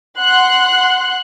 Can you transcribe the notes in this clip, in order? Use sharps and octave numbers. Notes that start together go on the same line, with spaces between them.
F#5 C6 F#6